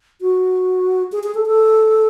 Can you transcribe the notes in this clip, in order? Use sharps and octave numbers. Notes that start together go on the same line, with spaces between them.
F#4
G#4
G#4
A4
A4